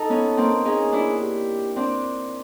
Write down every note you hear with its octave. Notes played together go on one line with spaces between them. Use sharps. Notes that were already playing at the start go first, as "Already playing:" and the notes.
Already playing: D#4 A4
B3 C#4
A#3 C4
C#4 D#4 G#4
D4 E4
G4
C4 D4